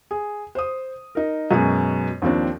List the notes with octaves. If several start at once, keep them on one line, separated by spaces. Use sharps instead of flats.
G#4
C5 D#6
D#4 A#4
F#2 B2 G#3 G#4
D#2 F3 C4 D4